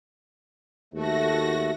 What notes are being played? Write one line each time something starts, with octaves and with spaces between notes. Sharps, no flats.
D#2 A3 F#4 A#6